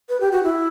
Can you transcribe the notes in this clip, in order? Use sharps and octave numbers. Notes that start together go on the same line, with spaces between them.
B4
G4
F#4
E4